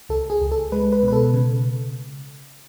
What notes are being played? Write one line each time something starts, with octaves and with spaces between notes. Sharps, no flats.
C#2 A4
G#4
C#2
A4
G#3 B4
B4
B2 B4
A4
C#3